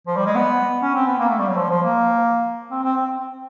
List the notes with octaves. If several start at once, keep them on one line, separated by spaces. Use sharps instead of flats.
F3
G3
G#3
B3
C#4
C4
B3
A#3
A3
G3
F#3
F3
F3
A#3
C4
C4
C4